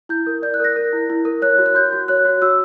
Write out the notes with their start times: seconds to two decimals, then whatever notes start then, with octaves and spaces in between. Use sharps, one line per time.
0.09 E4 G6
0.27 A#4
0.42 D5 G6
0.54 F#6
0.60 A#4 A#6
0.76 A#4
0.93 E4
1.10 E4
1.25 A#4
1.42 C#5 F#6
1.58 F#4
1.66 F#6
1.75 F#4 G6
1.92 F#4
2.08 C#5 F#6
2.25 F#4
2.42 F#4 E6